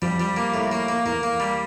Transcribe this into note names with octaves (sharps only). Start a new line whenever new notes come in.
F2 F3 G3
G3
A#3
A2
A#3
A#3
E2 E3 A#3
A#3
G3